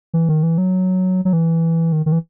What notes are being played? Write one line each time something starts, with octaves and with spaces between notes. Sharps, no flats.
E3
D#3
E3
F#3
F#3
E3
D#3
D#3
E3